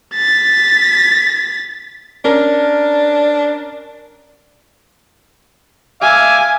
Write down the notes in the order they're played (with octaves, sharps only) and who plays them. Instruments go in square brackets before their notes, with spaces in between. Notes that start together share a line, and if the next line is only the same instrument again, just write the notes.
[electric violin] A6 B6
[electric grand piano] C#4 A#4 [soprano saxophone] D4
[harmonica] E5 F5 D6 [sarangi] G#5